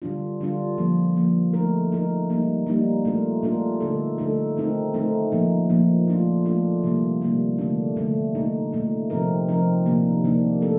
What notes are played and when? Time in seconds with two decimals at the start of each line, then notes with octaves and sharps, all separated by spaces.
0.02 D3 G3 D4 F4
0.41 D3 G3 D4 F4
0.78 D3 F3 A#3
1.16 D3 F3 A#3
1.53 A3 D#4 A#4
1.92 A3 D#4 A#4
2.30 G3 A#3 D#4
2.67 G3 A#3 D#4
3.05 A#2 A3 D4 F4 A#4
3.43 A#2 A3 D4 F4 A#4
3.81 D3 A3 D#4 A4
4.18 D3 A3 D#4 A4
4.57 D#3 A3 C4 D#4 A#4
4.94 D#3 A3 C4 D#4 A#4
5.32 A#2 F3 A#3 D#4
5.70 A#2 F3 A#3 D#4
6.08 A3 D4 F4
6.46 A3 D4 F4
6.84 C3 D#3 G3 A#3
7.22 C3 D#3 G3 A#3
7.58 D3 A3 D4
7.96 D3 A3 D4
8.35 A#2 A3 D#4
8.73 A#2 A3 D#4
9.10 C3 F3 C4 D#4 A#4
9.48 C3 F3 C4 D#4 A#4
9.86 C3 D#3 A#3 D4
10.24 C3 D#3 A#3 D4
10.61 A3 D4 A4